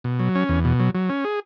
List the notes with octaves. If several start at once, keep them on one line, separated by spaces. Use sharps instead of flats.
B2
F#3
C#4
E2
B2
F#3
F#3
C#4
G#4